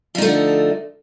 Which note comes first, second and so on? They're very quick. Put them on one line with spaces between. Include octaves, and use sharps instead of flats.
F3 D#4 A3 D3